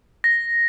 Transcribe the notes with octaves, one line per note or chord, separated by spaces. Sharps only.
A#6